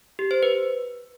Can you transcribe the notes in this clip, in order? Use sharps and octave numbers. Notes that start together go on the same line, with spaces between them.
G4
C5
B4